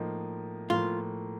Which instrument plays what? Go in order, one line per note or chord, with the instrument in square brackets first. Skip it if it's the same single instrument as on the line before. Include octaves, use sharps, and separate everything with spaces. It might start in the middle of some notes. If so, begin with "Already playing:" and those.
Already playing: [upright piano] A2 F3 A#3 D#4
[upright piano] A2 F3 A#3 [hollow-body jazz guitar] F4